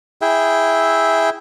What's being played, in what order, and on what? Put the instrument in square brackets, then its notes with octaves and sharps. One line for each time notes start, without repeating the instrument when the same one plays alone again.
[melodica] E4 G#4 E5 G5